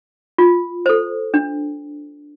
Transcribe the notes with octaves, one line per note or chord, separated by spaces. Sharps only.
F4
A4 C5
D4